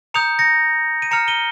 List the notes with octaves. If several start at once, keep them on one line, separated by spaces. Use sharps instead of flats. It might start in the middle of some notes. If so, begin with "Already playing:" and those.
A#5 D#6 G6 C#7 F7
A#6 C#7
D#7
A#5 F6 C#7 F7
D#7 G7